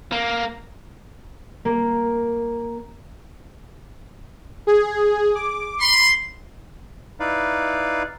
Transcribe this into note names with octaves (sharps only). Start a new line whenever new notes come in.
A#3
A#3
G#4
D6
B5 C6
D#4 E4 B4 D5 F5